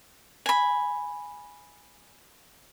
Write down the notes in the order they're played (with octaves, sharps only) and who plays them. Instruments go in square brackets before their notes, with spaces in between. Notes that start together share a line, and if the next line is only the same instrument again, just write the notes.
[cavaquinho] G#5 B5